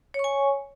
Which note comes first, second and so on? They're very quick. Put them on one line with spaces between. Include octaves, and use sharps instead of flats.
C#5 C#6 G#5